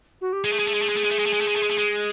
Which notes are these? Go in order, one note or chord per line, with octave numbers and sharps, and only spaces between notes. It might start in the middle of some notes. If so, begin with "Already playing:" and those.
F#4
G4
G#3 G#4
A3
G#3
A3
G#3
A3
G#3
A3
G#3
A3
G#3
A3
G#3
A3
G#3
A3
G#3
A3
G#3